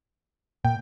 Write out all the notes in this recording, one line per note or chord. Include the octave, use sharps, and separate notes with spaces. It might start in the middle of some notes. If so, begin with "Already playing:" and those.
A#2 G5